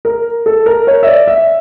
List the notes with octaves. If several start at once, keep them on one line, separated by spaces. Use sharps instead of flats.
A#4
A4
A#4
C#5
E5
D5
E5